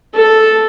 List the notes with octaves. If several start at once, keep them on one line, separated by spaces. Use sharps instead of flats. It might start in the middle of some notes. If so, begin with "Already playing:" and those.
A4